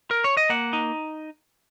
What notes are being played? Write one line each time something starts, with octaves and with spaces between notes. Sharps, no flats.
A#4
C#5
D#5
A#3 F#5
D#4